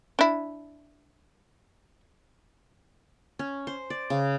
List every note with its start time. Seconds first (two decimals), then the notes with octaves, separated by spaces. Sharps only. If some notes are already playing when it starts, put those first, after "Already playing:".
0.19 D4 E4
3.39 C#4
3.67 C5
3.90 D5
4.10 C#3